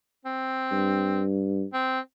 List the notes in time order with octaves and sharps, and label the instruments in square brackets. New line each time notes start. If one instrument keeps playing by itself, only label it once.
[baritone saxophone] C4
[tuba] G2
[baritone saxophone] C4